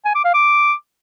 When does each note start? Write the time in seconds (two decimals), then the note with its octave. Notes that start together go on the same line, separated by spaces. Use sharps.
0.05 G#5
0.15 D6
0.25 F5
0.34 D6